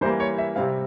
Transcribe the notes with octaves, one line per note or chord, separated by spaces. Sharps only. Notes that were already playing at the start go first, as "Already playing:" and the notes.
E3 G3 A#3 C5
C#5
E5
C3 G3 C4 F5